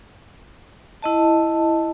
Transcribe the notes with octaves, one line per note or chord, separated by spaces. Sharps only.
E4 D#5 A5